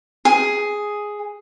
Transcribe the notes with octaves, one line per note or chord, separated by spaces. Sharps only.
G#4